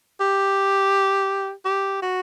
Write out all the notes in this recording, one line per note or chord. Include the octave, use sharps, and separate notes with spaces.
G4
G4
F#4